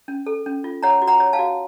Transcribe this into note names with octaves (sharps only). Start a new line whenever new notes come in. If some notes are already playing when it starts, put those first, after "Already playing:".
C#4
A4
C#4
F4
C#5 F#5 A#5
F#4
F#5 A#5
C#5
F5 A5
F#4